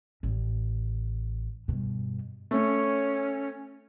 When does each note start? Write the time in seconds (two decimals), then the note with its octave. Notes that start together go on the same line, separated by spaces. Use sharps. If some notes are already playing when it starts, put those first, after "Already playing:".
0.23 A1
1.68 G2 B2
2.51 A3 C#4